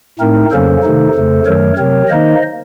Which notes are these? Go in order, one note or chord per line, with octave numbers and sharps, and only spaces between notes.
A2 A3 C4 D#4 A#4
F2 C#3 F#3 A#3 C#4 A4 C5
C3 D#3 A3 D#4
F2 C#3 A3
F#2 D#3 F#3 A3 A#4 C#5
C3 F#3 C4 A#4 C#5
D#3 A#3 D#4 C5 D#5